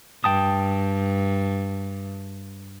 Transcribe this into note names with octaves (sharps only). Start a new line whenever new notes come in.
G2 G5 A5 D#6